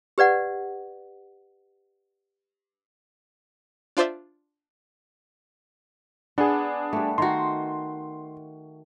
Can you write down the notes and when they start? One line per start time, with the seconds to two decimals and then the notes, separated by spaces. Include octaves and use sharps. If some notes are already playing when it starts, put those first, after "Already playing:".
0.18 G4 B4 D5 F#5
3.97 D4 F4 C5 D5 E5
6.38 B3 D4 G#4 A4
6.93 G3 A3
7.18 D#3 F#4 C6